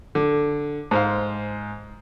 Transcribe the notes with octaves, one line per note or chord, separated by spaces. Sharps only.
D3
G#2 C5 F5